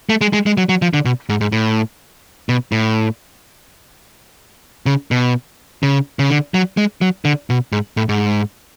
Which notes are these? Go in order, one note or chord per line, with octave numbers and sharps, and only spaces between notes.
A3
G#3
G#3
G#3
F#3
F#3
F3
D3
B2
G#2
G#2
A2
B2
A2
C#3
B2
C#3
C#3
D3
F#3
G#3
F#3
D3
B2
G#2
A2
G#2